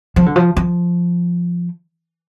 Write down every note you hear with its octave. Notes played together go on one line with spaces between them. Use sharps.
F3
D3
F3
F3